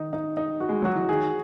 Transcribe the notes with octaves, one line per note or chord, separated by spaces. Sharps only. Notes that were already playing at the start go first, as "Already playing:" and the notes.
Already playing: D#3 D#4
D#4
D#4
F#4
G#3
F#3 F#4
E3
D#3 G#4